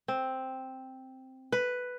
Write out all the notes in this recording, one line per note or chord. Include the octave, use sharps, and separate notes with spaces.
C4
B4